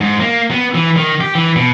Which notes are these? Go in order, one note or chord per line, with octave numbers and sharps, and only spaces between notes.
G#2
A#3
B3
E3
D#3
G4
E3
B2